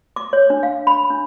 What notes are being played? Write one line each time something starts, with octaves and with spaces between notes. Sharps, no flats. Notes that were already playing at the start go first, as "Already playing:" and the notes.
D6
C#5
D4
F5
B5
D4